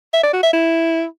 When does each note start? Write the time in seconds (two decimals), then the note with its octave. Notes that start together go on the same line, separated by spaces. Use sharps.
0.13 E5
0.23 D5
0.33 F#4
0.43 E5
0.53 E4